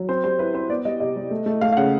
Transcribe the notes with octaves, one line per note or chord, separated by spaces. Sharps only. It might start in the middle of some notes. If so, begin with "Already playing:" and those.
Already playing: F#3
C4 C5
G3 C5
E4 B4
C4 C5
B3 D5
G3 D#5
C3 D#5
G3
A3
A3
A3 F5
F5
C#3 F#5